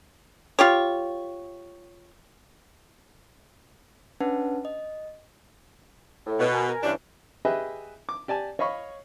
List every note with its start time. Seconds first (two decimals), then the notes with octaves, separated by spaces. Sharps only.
0.59 F4 G4 C#5
4.20 C#4 D4 B4 F#5 A5
4.65 D#5
6.26 A2
6.40 B2
6.52 A#4 G#5
6.67 A#4 G#5
6.83 G2 E3 C#4 D4
7.45 G4 G#4 B4 D#5 E5 G5
8.09 D6
8.28 G4 D5 G#5 A5
8.59 C#5 D#5 F5 B5 C#6